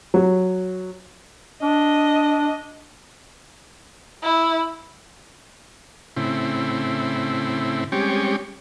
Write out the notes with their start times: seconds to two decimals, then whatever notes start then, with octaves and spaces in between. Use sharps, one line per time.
0.14 F#3
1.62 D4 D#5
4.23 E4
6.17 A2 C#3 C4 E4
7.92 G3 G#3 C4 C#4 G4 C#5